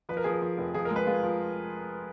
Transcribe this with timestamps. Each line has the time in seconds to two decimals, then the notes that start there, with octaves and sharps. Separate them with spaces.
0.09 F3 B4
0.17 A#4
0.24 F3 G#4
0.33 A#4
0.42 F3
0.58 F1
0.74 F3 G#4
0.85 A#4
0.91 G#3
0.96 B4
1.07 G#3 F4
1.23 F3